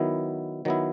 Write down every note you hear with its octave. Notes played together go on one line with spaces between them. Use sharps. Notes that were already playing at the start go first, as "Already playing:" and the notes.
Already playing: D#3 F#3 B3 E4
D#3 F#3 B3 E4